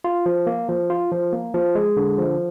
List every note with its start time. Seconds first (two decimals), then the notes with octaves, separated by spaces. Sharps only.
0.04 F4
0.26 F3
0.47 A#3
0.69 F3
0.90 F4
1.12 F3
1.32 A#3
1.54 F3
1.75 G#3
1.97 D3
2.18 F3